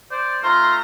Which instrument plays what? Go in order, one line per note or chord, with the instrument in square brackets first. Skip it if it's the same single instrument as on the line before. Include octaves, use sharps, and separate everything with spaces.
[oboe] C5 [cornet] D5
[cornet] A3 [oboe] F4 [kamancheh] A#5 [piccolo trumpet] C6